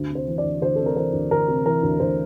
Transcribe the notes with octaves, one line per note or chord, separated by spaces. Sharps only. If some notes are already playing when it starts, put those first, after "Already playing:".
Already playing: D2
C3
C5
E3
D5
D2
D2 C5
C3 A4
A#4
E3 C5
D2
D2 A#4
C3
E3 A#4
D2
D2 C5